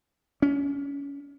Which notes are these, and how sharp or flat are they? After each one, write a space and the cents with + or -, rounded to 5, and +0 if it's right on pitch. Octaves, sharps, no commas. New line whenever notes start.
C#4 +25